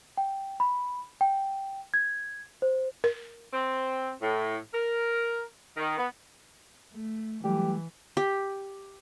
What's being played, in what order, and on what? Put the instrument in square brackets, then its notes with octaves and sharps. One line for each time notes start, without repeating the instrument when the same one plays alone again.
[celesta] G5
B5
G5
G#6
C5
[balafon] A#4
[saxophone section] C4
A2
A#4
D#3
B3
[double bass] A3
[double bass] E3 [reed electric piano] F#3 G3 A3 [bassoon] G4
[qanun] G4